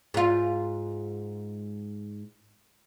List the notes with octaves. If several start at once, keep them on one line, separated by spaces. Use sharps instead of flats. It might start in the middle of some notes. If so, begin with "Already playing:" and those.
G#2 F4